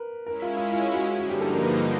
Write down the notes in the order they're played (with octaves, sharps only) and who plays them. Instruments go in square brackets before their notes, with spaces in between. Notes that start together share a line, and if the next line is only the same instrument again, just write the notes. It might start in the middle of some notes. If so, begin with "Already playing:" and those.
Already playing: [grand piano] A#4 B4
[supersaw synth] G#3 C#4 E4 [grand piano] A#4
[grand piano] F4
F4
F4
F#4
[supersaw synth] G2 D3 F3 A#3 D#4 [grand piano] F#4
[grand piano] G4
A4
A#4
B4